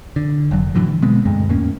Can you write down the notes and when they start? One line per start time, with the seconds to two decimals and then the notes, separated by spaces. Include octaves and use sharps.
0.16 D3
0.51 F1 F#3
0.75 A2 D3 E3 F#3
1.02 B2 G#3 B3 C4
1.25 D2 G2 G#3
1.49 E2 A2 A#3 C#4